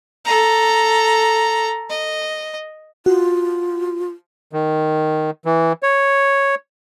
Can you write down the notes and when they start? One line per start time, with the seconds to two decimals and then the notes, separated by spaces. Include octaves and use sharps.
0.25 A4 A#5
1.89 D#5
3.06 F4 F#4
4.53 D#3
5.45 E3
5.83 C#5